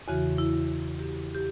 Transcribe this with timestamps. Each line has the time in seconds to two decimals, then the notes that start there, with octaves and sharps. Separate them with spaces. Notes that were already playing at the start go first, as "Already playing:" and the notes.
0.08 E2 C#3 E3 F#4
0.38 E4
0.99 G4
1.35 G4